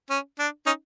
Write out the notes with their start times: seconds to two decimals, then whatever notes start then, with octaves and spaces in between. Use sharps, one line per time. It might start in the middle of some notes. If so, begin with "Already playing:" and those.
0.10 C#4
0.39 D4
0.66 C#4 D#4